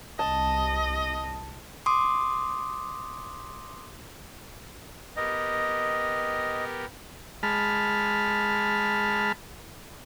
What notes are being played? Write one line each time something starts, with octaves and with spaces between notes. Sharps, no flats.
C2 D#5 A5
C6 D6 D#6
B3 G4 A#4 D#5
G#3 A5 B5 F6